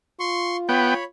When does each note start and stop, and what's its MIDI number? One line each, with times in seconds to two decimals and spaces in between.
0.20 1.06 65
0.20 0.57 84
0.20 0.57 85
0.69 0.94 59
0.69 1.04 73
0.69 0.94 79
0.69 1.04 83